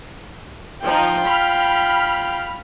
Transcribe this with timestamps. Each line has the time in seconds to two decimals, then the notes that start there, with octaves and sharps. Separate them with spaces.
0.83 F3 D#4 F4 G5
1.23 B5 F6